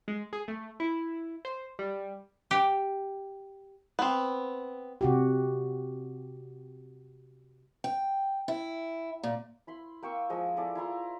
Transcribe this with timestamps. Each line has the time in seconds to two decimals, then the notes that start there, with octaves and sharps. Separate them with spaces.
0.08 G#3
0.33 G#4
0.48 A3
0.80 E4
1.45 C5
1.79 G3
2.51 G4
3.99 B3 C4
5.01 C3 F#4 G4
7.84 G5
8.48 E4
9.23 A#2
9.67 E4 B5 C6
10.02 A#3 G5 C#6 E6
10.30 F3 G#3 D#5
10.57 E4 G#4 A4 D5
10.75 E4 F4 A#5 C6